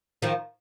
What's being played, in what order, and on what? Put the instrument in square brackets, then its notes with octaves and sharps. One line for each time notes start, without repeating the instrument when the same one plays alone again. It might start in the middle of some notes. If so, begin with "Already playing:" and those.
[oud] D#3 F3